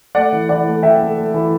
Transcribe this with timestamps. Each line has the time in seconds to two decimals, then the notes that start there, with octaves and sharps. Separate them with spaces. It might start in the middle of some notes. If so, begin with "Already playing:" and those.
0.15 A3 D5 F#5
0.32 E3
0.49 E3 D5 F#5
0.67 A3
0.83 E3 E5 G5
1.00 A3
1.17 A3
1.34 E3